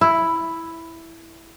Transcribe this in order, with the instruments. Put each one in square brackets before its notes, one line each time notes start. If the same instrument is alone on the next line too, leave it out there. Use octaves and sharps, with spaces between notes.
[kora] E4